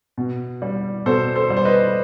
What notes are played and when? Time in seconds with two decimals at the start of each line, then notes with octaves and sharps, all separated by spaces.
0.18 B2
0.62 G3
1.06 B2 A4 C5
1.36 A4 C5
1.50 G3
1.57 C5
1.65 B4 D#5